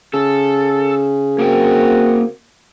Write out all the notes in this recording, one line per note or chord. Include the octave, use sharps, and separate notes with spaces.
C#3 A4
A#3 C4 F#4 A#4 F#5 G5